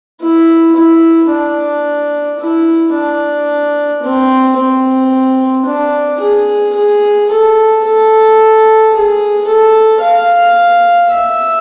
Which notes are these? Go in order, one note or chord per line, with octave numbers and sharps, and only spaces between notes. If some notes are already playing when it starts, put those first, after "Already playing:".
E4
E4
D4
E4
D4
C4
C4
D4
G#4
G#4
A4
A4
G#4
A4
F5
E5